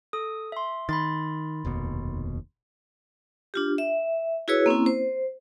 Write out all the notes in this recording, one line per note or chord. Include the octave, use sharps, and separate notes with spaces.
A4 D#6
E5 C6
D#3 B5 C6 A6
F1 D#2 B2
D4 F4 G4
E5
E4 F#4 G#4 B4 C#5 E6
A#3 C4 C#4 E4
C5